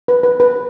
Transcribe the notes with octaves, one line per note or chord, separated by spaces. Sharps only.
B4
B4
B4